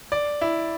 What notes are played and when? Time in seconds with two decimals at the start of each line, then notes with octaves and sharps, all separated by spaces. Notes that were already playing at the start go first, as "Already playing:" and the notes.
0.12 D5
0.41 E4